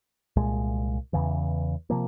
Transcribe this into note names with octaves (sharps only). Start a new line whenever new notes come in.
C2 A#2 G#3
E2 C#3 E3
C3 F3 A#3